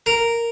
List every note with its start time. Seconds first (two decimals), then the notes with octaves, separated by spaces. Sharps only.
0.06 A#4